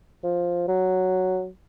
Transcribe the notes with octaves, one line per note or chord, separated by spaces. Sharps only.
F3
F#3